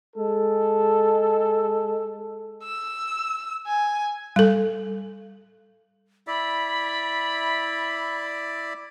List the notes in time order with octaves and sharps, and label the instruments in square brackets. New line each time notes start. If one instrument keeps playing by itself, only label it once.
[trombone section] G#3 A4
[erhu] E6
G#5
[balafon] G3 A4
[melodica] E4 D5 E5 [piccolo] B5